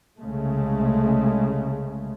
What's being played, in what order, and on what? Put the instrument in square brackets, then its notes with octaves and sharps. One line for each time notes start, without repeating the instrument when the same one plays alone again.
[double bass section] C2 C#3 G#3 A3